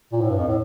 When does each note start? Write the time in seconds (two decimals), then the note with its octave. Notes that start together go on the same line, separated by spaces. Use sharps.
0.12 A#2
0.21 A2
0.29 G2
0.39 F2
0.48 A2